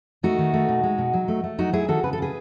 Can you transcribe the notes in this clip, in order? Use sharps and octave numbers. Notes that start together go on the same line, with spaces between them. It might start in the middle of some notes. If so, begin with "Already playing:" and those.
A3 D#4 F#4
D#3
A3
B2
G#3
B2
F#3
A3
A3
F#3 D#4 F#4
F#3 E4 G#4
D#3 F#4 A4
C#3 B4
A4
C#3 G#4 B4